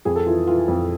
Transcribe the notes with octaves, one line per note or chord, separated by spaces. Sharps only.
F2 G#4
A4
E3 F4
E3 F4
F2